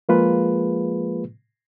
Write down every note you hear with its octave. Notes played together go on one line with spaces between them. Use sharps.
F3 G#3 A#3 F4 G#4 B4